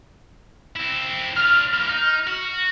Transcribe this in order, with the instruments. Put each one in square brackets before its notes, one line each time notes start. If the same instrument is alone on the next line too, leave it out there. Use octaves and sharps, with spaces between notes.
[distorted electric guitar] C4 E4
[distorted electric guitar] D4 F4 [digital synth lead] F6
[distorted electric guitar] E3 A#3
D#4
F#4